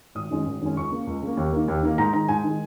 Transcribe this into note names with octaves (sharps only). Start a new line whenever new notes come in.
G#1 D#6
F#2 D#3 G#3 C#4
G#1
F#2 D#3 G#3 C#4
C#2 C#6
C#3 A#3
C#2
C#3 A#3
D#2
D#3 A#3
D#2
D#3 A#3
G#2 A#5
D#3 G#3 A#5
G#2 G#5
D#3 G#3